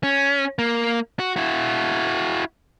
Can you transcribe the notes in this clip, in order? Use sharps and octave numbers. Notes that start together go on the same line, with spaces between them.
C#4
A#3
F#4
E4 F#4